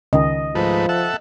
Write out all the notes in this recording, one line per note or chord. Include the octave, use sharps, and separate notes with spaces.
C#2 D#3 D#5
G#2 F3 A3 B4
A4 E5 F#5